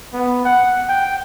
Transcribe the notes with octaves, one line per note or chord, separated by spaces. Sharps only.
B3
F#5
G5